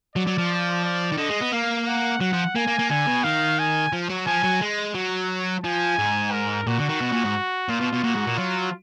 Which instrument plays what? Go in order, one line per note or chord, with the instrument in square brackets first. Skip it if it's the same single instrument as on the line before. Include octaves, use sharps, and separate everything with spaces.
[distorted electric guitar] F#3 [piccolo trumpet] D5
[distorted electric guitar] F#3
F3
[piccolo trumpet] D5
[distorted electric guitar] D#3
[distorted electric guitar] D3 [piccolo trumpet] D#5
[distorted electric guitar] G#3
B3
[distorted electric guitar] A#3 [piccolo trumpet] F5
[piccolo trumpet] F#5
[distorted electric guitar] F#3 [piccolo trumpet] F#5
[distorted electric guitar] F3
[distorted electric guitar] A#3 [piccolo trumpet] G#5
[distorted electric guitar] A#3
A#3
[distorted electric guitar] D3 [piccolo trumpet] G#5
[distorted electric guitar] B2
[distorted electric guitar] D#3 [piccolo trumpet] F5
[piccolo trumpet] G#5
[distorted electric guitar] F3
F#3
[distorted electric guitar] F3 [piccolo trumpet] G#5
[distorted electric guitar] F#3
G#3
F#3
[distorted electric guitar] F3 [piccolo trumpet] G#5
[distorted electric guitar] G#2
[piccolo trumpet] A#4
[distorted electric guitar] A#2 [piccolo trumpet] F#4
[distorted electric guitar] D3
D#3
B2
A#2
G#2
[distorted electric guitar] A#2 [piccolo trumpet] F4
[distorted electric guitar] B2
B2
[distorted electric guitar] A#2 [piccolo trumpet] F#4
[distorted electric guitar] G#2
A#2
[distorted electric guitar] F#3 [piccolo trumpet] F4